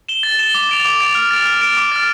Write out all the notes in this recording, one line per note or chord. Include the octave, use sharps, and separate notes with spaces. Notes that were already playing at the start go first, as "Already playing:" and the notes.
E7 G7
A6
E7 G7
D6
A6 D7 F7
D6
A6 D7 F7
F6
A6 D7 F7
F6
A6 D7 F7
D6
F6 A6